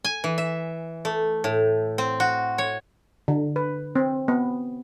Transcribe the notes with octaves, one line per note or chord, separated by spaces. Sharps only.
G#5
E3
E5
A3
A2
C4
F#4
C#5
D3
B4
C4
B3